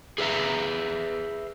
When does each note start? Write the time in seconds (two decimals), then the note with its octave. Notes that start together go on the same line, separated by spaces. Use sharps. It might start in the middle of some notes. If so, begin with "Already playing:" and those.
0.18 G#4 B4 D5 E5 A#5